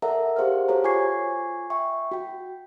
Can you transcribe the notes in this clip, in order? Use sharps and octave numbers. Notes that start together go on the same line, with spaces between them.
A4 A#4 D5 E5 F#5 A#5
G4 G#4 C5 F5 F#5 F6
F#4 G4 A4 C5 C#5 A#5
F4 G#5 C#6 D6 G#6 C7
E5 G5 C#6
F#4 G5